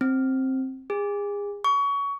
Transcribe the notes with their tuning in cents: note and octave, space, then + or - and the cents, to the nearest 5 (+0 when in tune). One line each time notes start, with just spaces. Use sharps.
C4 +10
G#4 -30
C#6 +25